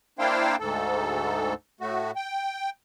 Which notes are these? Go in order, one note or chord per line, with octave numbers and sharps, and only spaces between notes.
A#3 D4 E4 C5 F5 G5
D2 G#2 A4
A2 A3 F#4
G5